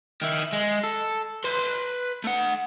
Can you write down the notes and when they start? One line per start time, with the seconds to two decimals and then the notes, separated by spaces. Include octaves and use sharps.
0.22 D#3 E4
0.53 G#3
0.84 A4
1.44 B4 C6
2.24 A3 F#5